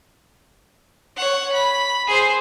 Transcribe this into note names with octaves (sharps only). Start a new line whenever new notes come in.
C#5 F#5
B5
G#4 C5